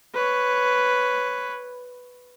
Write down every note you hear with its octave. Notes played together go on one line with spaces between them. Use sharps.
B4 C#5